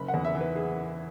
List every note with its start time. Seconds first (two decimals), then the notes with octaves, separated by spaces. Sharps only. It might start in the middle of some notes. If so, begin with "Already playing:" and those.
Already playing: F#1 B5
0.08 F#5
0.13 E2
0.25 E5
0.35 E3
0.41 B4
0.56 G#4